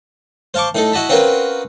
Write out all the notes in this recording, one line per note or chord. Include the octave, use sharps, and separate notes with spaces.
C5 F5 A5 C#6 D6
A2 D#4 A4
E4 F#4 D#5 A5 B5
C4 C#4 F4 F#4 A#4 B4